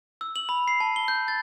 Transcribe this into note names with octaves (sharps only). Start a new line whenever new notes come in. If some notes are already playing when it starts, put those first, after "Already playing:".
E6
F#7
B5
C7
A5
G7
G6
A6